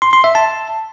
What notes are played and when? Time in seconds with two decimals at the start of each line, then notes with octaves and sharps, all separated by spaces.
0.02 C6
0.13 C6
0.24 E5
0.35 A5